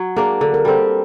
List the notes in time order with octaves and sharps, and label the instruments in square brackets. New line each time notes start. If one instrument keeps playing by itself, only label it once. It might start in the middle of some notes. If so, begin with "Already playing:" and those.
Already playing: [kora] F#3
[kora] A#3 D4 [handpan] G#4
[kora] D3 [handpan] A4
[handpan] A#4
[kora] G3 C4 [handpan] A4